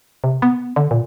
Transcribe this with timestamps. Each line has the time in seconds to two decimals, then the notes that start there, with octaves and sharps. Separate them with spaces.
0.24 C3
0.42 B3
0.76 D3
0.91 A#2